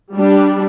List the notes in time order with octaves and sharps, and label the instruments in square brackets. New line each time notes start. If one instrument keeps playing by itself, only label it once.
[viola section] G3 D4